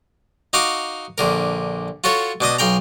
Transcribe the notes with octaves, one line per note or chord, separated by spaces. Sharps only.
D#4 F#4 F5 D6 D#6
A#1 D3 A#4
F4 F#4 A4 C#5
B2 D4 D#5 D#6
B1 F5 G5 A#5